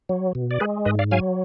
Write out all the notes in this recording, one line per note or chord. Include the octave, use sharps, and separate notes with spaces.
F#3
B2
D5
G#3 G#4 B4
G#2 B4 D#5
D5 F5
F#3 F5 G#5